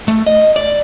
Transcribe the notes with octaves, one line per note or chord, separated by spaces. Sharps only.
A3
D#5
D5